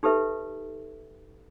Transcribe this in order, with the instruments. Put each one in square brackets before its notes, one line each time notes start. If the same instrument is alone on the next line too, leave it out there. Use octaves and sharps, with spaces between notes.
[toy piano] D#4 G4 A4 B4 E5